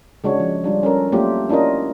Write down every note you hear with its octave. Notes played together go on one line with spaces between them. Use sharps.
C#3 G#3 D4 F#4 C#5
F3
G3 D4 F4
C#4 A4 A#4
F#3 A3 A#3 C4 F4 G4
C#4 D4 E4 F4 A#4 D#5